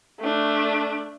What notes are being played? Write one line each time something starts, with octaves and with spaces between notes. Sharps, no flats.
A3 D4